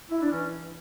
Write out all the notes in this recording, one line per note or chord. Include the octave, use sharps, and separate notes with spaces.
E4
D4
E3 C#4